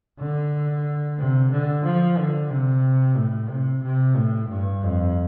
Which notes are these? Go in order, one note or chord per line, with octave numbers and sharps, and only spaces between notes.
D3
C3
D3
F3
D3
C3
A2
C3
C3
A2
G2
F2